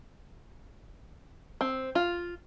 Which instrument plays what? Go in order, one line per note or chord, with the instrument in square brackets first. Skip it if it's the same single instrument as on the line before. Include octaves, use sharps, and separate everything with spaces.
[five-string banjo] C4
F4